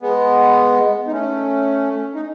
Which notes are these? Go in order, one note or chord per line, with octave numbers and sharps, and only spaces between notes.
G#3 B3
D#4
A3 C#4
D#4